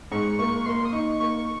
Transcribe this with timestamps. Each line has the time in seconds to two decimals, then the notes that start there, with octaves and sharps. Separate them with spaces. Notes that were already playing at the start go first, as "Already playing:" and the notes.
0.12 G#2 C#6
0.39 A#3 C#6
0.66 A#3 C6
0.85 D#6
0.92 D#4 C#6
1.20 A#3 C#6